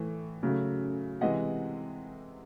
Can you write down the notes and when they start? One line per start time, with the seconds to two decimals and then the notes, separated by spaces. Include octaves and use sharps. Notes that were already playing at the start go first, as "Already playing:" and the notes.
Already playing: A2 E3 A3
0.43 C#3 F#3 A3
1.21 C3 E3 G#3 D#5 F#5